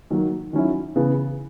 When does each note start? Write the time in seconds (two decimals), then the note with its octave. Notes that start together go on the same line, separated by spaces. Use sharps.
0.10 D#3 F#3 A#3
0.53 D#3 F#3 C#4 E4
0.96 C#3 E3 B3